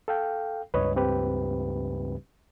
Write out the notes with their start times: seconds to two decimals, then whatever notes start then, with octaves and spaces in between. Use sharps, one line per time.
0.08 A4 F5 G5
0.74 C#2 G2 B4 C#5 D#5
0.96 C4 G4 B4